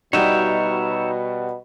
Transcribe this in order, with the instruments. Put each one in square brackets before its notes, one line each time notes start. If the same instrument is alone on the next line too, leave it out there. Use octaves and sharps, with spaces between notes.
[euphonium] B2 [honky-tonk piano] G3 F#4 [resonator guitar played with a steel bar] D#4 [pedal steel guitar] C#5 E5 G5